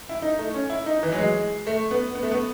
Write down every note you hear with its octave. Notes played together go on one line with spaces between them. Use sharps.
E4
D#4
A3
C#4
E4
D#4
E3
F#3
G#3
A3
B3
B3
A3
B3